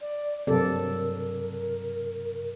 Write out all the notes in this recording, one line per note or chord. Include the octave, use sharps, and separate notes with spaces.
D5
G2 C3 F#3 A4 A#4 D5